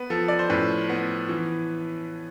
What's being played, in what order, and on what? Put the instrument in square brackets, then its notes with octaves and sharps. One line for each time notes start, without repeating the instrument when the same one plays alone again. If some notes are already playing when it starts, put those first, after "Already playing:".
Already playing: [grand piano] B3 B4
F3 A4
D5
C5
A2 B4
B3
E3